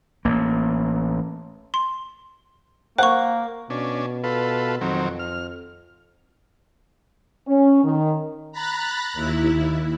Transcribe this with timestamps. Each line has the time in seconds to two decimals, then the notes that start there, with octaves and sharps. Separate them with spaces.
0.25 A1 A#3
1.74 C6
2.98 A#3 C5 F#5 C#6
3.70 B2 C#4 D4
4.24 F4 A4 B4
4.81 F2 D#3 F#3 C4
5.19 F6
7.48 C#4
7.84 D#3
8.52 A#5 B5 F#6 A6
9.13 D#2 E4